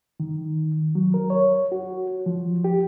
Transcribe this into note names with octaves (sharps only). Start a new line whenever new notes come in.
D#3
F#3
A#4
C#5
F#4
F3
G4